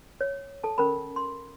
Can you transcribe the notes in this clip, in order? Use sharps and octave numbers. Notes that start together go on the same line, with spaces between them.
C#5
A4 A5
C#4 A#4 B5
C6